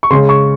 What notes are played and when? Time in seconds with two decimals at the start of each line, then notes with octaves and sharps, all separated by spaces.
0.03 C#6
0.10 C#3 G#3 C#4 C6
0.29 C#6